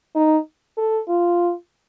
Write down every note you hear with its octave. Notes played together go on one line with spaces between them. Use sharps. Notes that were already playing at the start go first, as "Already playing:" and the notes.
D#4
A4
F4